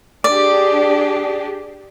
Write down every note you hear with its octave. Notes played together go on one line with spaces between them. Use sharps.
D4 G4 G#4 D5